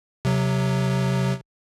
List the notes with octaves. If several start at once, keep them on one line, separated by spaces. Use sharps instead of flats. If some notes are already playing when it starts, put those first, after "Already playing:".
C3 F#3